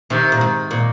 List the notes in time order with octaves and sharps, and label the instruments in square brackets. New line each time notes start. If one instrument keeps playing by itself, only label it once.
[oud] C3 [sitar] D#3
[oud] A#2
G#2
A#2